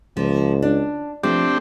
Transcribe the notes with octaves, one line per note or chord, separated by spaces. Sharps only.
C#2 F3 A#3
D4
F3 A3 C4 D4 G4